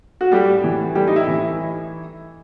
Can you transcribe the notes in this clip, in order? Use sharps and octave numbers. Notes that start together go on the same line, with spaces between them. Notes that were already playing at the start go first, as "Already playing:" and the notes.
F#4
A2 G3 G4
E3
A2 G3 G4
D#4
E4
E3